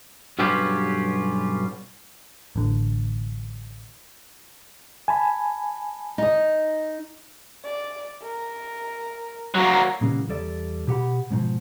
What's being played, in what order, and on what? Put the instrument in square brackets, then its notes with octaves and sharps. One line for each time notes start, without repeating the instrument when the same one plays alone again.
[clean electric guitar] B1 G2 B3 C#4 F4 G4
[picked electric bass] A1 D3
[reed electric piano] G#5 A5 B5
[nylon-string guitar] D#4 D#5
[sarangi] D5
A#4
[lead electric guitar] F#3 A#3 [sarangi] F#4
[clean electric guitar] A#2 C#3 E3 G3 A#3 B3
E2 G3 A4 D5
B2 G4 F#5 B5
G#2 B2 D#3 F3